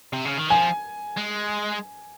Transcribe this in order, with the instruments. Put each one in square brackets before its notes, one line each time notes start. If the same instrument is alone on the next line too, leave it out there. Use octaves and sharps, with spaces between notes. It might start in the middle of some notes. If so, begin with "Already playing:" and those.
[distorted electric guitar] C3
C#3
D#3
[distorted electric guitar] F3 [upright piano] G#5
[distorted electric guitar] G#3